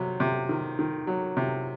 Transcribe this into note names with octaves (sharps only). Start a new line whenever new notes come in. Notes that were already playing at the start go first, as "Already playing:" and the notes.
Already playing: C3 F#3
C3
D#3
D#3
F#3
C3